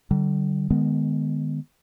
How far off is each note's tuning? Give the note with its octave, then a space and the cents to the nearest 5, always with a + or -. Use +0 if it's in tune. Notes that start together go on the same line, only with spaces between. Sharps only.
D3 +0 G3 -40
D#3 -30 G#3 +0 B3 +0